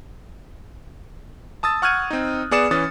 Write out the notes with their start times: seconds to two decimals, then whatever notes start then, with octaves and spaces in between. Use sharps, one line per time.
1.63 A5 D#6 E6 A6
1.82 F#5 C#6 F6 F#6 G#6 D#7
2.10 C4 D#4
2.51 B3 G#4 D5 D#6 C#7 E7
2.71 E3 C#4 D#6 A6